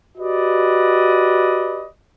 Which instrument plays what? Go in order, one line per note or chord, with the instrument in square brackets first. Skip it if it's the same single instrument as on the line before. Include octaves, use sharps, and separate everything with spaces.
[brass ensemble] F#4 G4 B4 D5 D#5